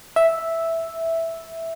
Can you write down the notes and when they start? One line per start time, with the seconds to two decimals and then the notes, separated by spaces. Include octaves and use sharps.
0.16 E5